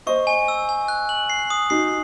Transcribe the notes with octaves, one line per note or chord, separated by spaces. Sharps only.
C5 D#5 C#6
G#5
E6
G#5
F#6
F#7
C7
D#6
D#4 F#4 C7